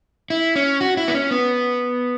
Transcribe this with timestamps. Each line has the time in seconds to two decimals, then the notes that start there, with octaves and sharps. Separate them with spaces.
0.30 E4
0.56 C#4
0.80 F#4
0.97 E4
1.08 B3
1.14 C#4
1.31 B3